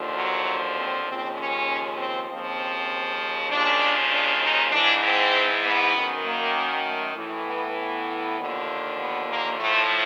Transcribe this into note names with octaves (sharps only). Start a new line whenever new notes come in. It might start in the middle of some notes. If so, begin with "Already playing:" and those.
Already playing: D#2 D3 F3
F#3
C4
D#2 C#3 F3 C4
C#4
C4
D#2 C#3 F3 C4
D#2 C#3 F3 D4
D4
D#4
G#2 E3 D4
C4
B3
F#2 D#3
A#3
A3
A2 E3
B3
B3
D#2 D3 F3
B3
A#3
A2 F3 A3